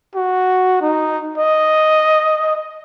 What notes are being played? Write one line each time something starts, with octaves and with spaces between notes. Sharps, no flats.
F#4
D#4
D#5